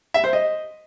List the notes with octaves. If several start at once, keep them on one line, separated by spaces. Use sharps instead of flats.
E5
C5
D#5